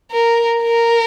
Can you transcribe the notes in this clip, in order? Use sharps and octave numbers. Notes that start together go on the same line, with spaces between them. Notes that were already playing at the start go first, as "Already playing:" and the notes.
A#4
A#4